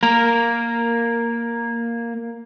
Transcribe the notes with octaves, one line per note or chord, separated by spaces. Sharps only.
A#3 A#4